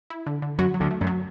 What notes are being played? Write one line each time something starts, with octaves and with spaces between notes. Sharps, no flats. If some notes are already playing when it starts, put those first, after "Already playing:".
E4
D3
D3
F#2 F#3 F#4
F#3
D2 D3
A3
F#2
F#3